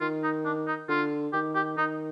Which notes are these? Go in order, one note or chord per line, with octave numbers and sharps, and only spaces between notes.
D#3 F4
D#4
D4
D#4
D3 F4
D#3 G4
G4
D#3 D#4